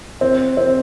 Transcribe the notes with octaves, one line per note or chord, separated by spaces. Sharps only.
C4
C4